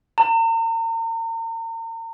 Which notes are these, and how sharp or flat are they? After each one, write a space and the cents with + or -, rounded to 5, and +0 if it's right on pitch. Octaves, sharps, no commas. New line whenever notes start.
A#5 -40